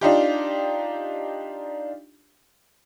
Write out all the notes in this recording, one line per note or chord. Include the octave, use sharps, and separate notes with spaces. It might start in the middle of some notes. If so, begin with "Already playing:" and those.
D4 D#4 F4 G4